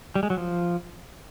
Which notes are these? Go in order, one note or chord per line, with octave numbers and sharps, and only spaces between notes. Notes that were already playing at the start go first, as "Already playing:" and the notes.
G3
G#3
F#3
F3